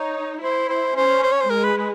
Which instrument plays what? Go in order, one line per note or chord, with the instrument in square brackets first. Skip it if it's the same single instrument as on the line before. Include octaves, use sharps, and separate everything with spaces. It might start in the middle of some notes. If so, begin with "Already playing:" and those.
Already playing: [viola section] D#4 [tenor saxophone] C#5
[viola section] E4 [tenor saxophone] C5
[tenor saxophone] C5
[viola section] C#4 [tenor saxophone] C5
[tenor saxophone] C5
C#5
C5
[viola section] G#3 [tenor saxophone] A#4
[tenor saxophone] B4
B4